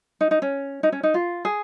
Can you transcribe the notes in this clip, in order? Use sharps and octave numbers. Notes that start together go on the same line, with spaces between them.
D#4
D#4
C#4
D#4
C#4
D#4
F4
G#4